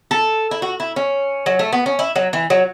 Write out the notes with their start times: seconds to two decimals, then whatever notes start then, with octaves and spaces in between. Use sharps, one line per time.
0.11 A4
0.51 E4
0.62 F#4
0.80 E4
0.96 C#4
1.46 F#3
1.59 A3
1.72 B3
1.86 C#4
1.99 E4
2.16 F#3
2.33 E3
2.50 F#3